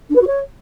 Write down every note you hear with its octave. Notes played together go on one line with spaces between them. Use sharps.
D4
B4
F#4
C#5